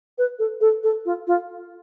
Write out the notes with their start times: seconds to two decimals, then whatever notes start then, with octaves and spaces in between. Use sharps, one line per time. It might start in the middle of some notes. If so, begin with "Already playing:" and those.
0.18 B4
0.39 A4
0.61 A4
0.83 A4
1.06 F4
1.27 F4